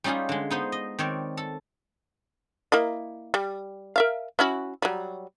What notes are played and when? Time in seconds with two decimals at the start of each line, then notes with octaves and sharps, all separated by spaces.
0.04 G3 C#4 D#4 F4 G4 G#4
0.29 D3 G#3
0.51 B3 D#4 C5
0.72 D#5
0.99 D#3 C4 C#5 D5
1.37 A4
2.72 A#3 E4 D#5
3.34 G3
3.96 A#4 E5 F5
4.39 C#4 E4 F#4
4.82 F#3 G3